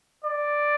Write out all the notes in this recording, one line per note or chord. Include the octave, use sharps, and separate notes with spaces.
D5